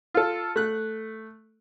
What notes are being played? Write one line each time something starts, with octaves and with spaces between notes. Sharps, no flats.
F4 A4
A3 F#6